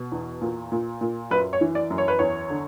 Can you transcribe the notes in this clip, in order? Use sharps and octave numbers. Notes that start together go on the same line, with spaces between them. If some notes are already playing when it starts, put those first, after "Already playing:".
Already playing: B2
E2
A#2
A#2
A#2
F#2 B4
C#5
E3
D5
F#2
C#5
B4
E2 C#5
D3